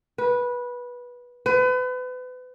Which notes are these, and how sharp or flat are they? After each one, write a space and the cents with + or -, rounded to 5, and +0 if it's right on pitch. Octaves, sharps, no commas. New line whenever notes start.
B4 -15
B4 +35